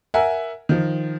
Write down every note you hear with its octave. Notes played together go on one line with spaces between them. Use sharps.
A#4 E5 F#5 G#5
D#3 F3